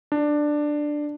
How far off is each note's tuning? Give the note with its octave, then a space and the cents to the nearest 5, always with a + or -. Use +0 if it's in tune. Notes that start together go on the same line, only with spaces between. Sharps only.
D4 +10